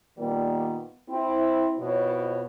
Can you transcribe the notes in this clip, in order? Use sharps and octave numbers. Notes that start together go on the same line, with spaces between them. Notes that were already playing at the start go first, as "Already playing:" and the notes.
A#2 D#3 G3 A#3 B3
C4 E4
F2 B2 E4 C#5